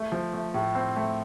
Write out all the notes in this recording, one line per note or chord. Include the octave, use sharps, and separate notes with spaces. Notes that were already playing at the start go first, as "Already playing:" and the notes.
Already playing: A3
F3
A3
A2
C4
A3